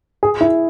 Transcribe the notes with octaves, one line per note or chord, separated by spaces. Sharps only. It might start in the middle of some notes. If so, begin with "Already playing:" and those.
G#4
E4